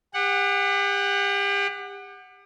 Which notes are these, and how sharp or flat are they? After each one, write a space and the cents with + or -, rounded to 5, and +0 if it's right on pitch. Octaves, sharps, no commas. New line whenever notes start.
G4 +35 F#5 +0